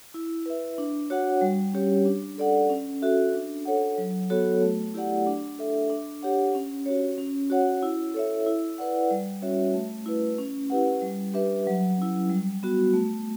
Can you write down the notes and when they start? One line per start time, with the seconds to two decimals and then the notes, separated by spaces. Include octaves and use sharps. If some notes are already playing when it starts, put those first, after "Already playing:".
0.14 E4
0.46 B4 E5
0.78 D4
1.10 F#4 C#5 F#5
1.41 G3
1.74 C#4 G4 C#5
2.05 D4
2.38 A4 D5 F#5
2.70 C#4
3.02 F#4 A4 E5
3.34 D4
3.65 A4 C#5 F#5
3.98 F#3
4.30 B3 F#4 A4 C#5
4.61 A3
4.94 E4 G4 D5 F#5
5.27 D4
5.59 A4 E5
5.90 D4
6.23 G4 C#5 F#5
6.55 C#4
6.86 F#4 C#5
7.18 C#4
7.50 F#4 C#5 F#5
7.82 E4
8.14 A4 C#5 E5
8.46 E4
8.78 B4 D5 F#5
9.11 G3
9.42 C#4 F#4 C#5 E5
9.74 A3
10.06 E4 B4
10.38 C#4
10.70 E4 G4 B4 F#5
11.02 G3
11.34 D4 G4 B4 E5
11.67 F#3
11.98 C#4 E4
12.30 G3
12.63 B3 F#4
12.94 A3